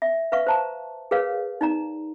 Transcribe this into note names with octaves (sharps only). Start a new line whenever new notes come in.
E5
B4 E5 F5 C#6
C5 A5 A#5
G#4 A#4 B4 C#5 F5
D#4 D5 A#5